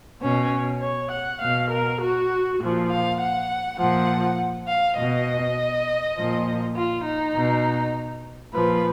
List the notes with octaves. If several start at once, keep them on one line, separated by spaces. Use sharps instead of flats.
B2 C#4
C#5
F#5
B2 F5
A#4
F#4
A#2 F3
F5
F#5
A#2 F3 F#5
F5
B2 D#5
A#2 F3
F4
D#4
B2
A#2 F3 B4